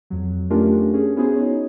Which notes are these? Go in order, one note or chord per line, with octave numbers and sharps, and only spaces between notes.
F2 F#3
A3 C#4 D4 F4 G4 A#4
C#4 G#4
B3 C#4 E4 F#4 G#4 C5
D#4 C#5